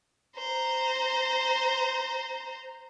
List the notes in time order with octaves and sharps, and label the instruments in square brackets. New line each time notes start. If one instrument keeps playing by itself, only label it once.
[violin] C5 A#5